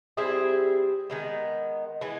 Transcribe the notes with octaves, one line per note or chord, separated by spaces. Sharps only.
G3 C4 E4 G#4
D#3 G#3 B3
E3 G#3 B3